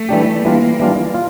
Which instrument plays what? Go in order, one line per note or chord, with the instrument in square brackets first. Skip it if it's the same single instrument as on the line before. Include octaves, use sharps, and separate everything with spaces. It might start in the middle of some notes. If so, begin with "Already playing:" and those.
Already playing: [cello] A3
[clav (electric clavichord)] E3 G3 D4 G4
[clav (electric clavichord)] E3 G3 D4 F4 [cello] A#3
[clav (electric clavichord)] E3 G3 D4 F4
F4